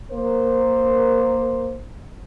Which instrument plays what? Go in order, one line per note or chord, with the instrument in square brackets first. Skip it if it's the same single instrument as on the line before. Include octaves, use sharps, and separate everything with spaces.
[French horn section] A#3 A#4 C5